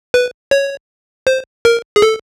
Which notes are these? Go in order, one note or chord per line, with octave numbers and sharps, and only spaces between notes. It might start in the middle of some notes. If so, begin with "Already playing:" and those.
B4
C#5
C5
A#4
G#4
A4